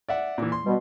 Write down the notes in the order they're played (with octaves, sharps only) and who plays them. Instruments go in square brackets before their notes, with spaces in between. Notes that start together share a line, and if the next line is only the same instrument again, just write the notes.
[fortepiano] D5 E5 F#5
A#2 E3
C6
[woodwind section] B2 G3